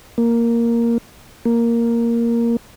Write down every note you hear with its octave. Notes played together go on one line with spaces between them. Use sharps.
A#3
A#3